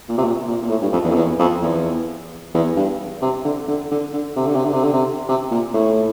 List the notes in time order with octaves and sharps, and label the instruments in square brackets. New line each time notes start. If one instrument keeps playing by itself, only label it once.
[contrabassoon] A#2
C3
A#2
A#2
A#2
A2
G2
F2
E2
F2
E2
F2
E2
E2
G2
C3
D3
D3
D3
D3
C3
D3
C3
D3
C3
D3
C3
C3
A#2
A2